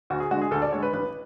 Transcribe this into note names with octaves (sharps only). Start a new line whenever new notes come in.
D2 F#4
G#4
D3 G#3 F#4
G#4
D2 A4
D5
D3 G#3 C#5
B4
A1 B4